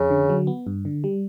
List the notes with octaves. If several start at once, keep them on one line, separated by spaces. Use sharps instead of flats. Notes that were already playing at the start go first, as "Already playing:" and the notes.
Already playing: F2 C#3
D3
F#3
B3
G2
D3
G3